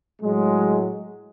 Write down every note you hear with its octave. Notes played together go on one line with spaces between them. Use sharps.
A2 F#3 G#3